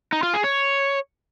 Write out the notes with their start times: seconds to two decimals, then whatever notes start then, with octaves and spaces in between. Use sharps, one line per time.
0.13 D#4
0.23 F4
0.34 G#4
0.44 C#5